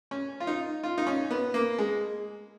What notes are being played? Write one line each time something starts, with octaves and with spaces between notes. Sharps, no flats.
C#4
F4
D#4
F4
D#4
C#4
B3
A#3
G#3